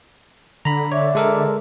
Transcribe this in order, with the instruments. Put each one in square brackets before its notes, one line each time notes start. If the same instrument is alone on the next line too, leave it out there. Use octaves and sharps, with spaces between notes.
[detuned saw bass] D3 [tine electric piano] A#5 B5
[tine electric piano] C#5 [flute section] D5 E5 D6
[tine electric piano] G#3 A4 A#4